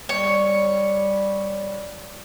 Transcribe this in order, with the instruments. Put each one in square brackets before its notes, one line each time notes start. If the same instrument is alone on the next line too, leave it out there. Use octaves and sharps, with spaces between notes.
[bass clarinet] G3 [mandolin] C#5